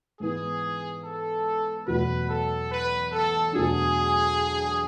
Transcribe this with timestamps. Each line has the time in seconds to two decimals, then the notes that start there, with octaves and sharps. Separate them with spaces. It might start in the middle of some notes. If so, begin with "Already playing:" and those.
0.20 G#2 E3 B3 G#4
1.04 A4
1.87 E2 B2 F#3 A3 B4
2.29 A4
2.70 B4
3.12 A4
3.53 E2 B2 F#3 A3 D4 G#4